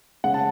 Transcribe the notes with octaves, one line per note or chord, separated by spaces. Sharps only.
C#3 G#3 F#5
A5